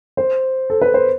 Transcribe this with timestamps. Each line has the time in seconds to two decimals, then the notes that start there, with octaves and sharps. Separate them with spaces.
0.17 C5
0.70 A4
0.82 B4
0.94 C5